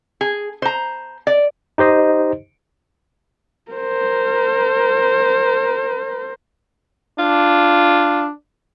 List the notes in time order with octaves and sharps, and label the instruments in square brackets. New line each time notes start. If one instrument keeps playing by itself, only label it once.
[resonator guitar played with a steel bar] G#4
C5 A#5
D5
[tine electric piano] D#4 G4 C5 D#5
[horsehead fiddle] A#4 C5
[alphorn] D4 [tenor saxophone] F4